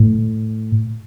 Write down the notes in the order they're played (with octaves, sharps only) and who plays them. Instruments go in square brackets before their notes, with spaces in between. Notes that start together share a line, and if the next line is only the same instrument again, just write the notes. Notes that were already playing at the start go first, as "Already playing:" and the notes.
Already playing: [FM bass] A2